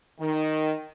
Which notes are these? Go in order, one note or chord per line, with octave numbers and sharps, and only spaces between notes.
D#3